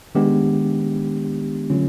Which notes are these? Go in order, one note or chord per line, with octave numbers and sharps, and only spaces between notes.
D#3 G#3 B3 D4 G4
D3 F#3 A3 C#4 F4